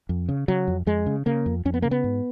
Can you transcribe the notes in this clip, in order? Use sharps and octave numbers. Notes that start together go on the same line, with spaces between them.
F2
C#3
C#3 F#3
F2
F2 G#3
C#3
C#3 A#3
F2
F2 C#4
B3
C#3 A#3
B3
G#2